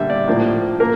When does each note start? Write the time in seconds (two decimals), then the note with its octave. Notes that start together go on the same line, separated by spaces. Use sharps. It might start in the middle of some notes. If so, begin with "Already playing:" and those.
Already playing: D3 G3 A#3 E5
0.10 D5
0.28 A2 F3 A#3
0.80 A#3 A#4